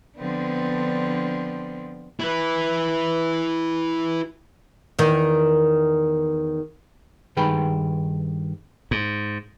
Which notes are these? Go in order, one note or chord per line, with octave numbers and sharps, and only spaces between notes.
D3 F3 B3 C4 D4
E4 B4
E2 D#3
G2 D#3 G#4 B4 G5 B5
G#2